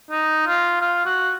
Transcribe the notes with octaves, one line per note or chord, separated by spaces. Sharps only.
D#4
F4
F4
F#4